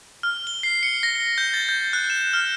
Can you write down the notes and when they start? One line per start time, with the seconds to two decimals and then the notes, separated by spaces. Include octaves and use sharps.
0.23 F6
0.47 G7
0.63 C7
0.83 C#7
1.03 A#6
1.38 G6
1.54 A6
1.69 G6
1.93 F#6
2.10 E7
2.33 F6